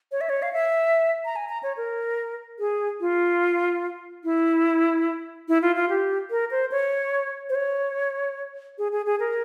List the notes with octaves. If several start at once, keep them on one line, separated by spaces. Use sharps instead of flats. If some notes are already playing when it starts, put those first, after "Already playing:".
C#5
E5
C#5
F5
E5
A#5
G#5
A#5
C#5
A#4
G#4
F4
E4
E4
F4
F4
G4
A#4
C5
C#5
C5
C#5
G#4
G#4
G#4
A#4